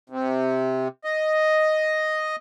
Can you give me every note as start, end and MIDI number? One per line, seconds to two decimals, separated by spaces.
0.10 0.88 48
1.04 2.36 75